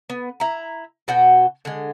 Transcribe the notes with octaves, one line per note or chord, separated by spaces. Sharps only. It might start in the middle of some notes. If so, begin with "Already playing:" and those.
B3
E4 A#5
B2 F#4 F#5 G5
D3 G#3